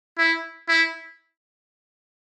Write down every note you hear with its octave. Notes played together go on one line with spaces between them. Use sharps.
E4
E4